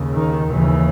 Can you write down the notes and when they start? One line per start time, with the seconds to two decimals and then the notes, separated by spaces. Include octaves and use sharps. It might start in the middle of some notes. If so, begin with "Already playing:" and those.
Already playing: D#2 C#3
0.14 D#3
0.53 D#2 C#3 E3